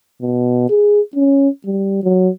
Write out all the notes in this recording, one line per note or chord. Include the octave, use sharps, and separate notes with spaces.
B2
G#4
C#4
G3
F#3